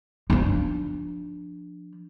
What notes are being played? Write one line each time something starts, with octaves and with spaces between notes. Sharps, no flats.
F3 D4